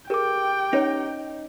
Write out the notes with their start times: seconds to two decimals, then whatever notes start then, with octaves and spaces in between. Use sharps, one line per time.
0.10 G4 G#4 A#4 B4 G5 D6
0.73 C#4 D#4 B4 C#5